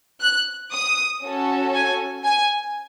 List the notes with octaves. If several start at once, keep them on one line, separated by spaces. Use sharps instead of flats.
F#6
D#6
C#4 F#4 A4
G#5
G#5